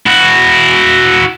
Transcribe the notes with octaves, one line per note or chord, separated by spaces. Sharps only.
E4 F#4